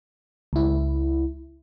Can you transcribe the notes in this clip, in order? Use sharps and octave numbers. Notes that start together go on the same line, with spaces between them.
C#2 E4